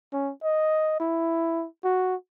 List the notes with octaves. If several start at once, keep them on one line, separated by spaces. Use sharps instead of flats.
C#4
D#5
E4
F#4